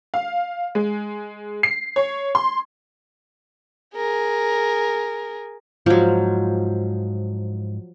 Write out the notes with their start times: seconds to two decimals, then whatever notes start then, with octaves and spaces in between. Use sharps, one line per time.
0.14 F5
0.75 G#3
1.63 C7
1.96 C#5
2.35 C6
3.95 G#4 A#4
5.86 G#2 F3 F#3